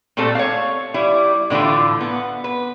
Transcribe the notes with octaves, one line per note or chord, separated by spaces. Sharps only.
A#2 G3 A3 C4 A4
C#5 F5
G3 E4
A2 D3 E3 A3 F4
B3
B4